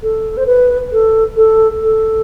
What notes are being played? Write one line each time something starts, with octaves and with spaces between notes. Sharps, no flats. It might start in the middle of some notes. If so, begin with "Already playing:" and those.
A4
C5
B4
A4
A4
A4